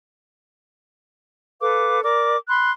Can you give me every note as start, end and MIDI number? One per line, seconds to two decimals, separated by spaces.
1.61 2.00 69
1.61 2.00 71
1.61 2.00 77
1.61 2.00 86
2.03 2.36 70
2.03 2.36 74
2.03 2.36 86
2.48 2.71 83
2.48 2.71 84
2.48 2.71 90